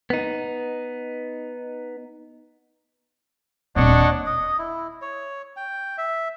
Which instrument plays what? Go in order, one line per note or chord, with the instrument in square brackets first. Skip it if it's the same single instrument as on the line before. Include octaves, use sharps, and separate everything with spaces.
[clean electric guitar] B3 D#4
[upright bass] D#1 C4 [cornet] D4 [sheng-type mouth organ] C#5 D#5 F#5
[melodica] D#5
E4
C#5
G5
E5